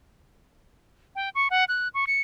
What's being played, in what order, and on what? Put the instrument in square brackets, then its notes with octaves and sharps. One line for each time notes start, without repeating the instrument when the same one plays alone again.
[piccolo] G5
C#6
F#5
F#6
C#6
C#7